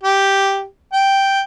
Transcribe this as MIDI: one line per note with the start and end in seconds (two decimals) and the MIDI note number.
0.03 0.64 67
0.93 1.41 79